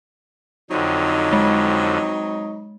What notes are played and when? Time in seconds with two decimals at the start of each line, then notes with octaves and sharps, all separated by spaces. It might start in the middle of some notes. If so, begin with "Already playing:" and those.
0.71 F2 D3 F#3 C4 D#4
1.33 G#3